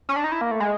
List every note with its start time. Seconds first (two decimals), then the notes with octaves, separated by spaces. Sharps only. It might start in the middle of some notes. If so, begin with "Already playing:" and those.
0.09 C#4
0.16 D4
0.24 D#4
0.32 E4
0.41 A#3
0.51 A3
0.60 G#3